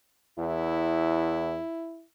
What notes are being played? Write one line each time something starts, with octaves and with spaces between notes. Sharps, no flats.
E2 E4